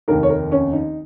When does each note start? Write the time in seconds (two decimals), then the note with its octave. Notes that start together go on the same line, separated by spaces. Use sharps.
0.08 F1 D#2 D#3 A#4
0.23 C#5
0.30 A#4
0.52 C#4
0.73 D#4